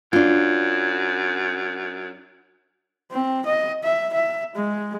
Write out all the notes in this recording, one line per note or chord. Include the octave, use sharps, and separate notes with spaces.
F#2 D4 F4
C4
D#5
E5
E5
G#3